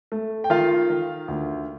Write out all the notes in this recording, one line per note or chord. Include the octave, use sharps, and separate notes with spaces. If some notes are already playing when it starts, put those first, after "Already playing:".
A3
G5
D#3 F4 F5
D#3
D2